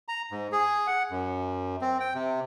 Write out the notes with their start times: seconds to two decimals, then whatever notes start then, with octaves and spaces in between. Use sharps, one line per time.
0.08 A#5
0.31 G#2
0.52 G#4
0.87 F#5
1.11 F#2
1.81 C4
2.00 G5
2.14 C3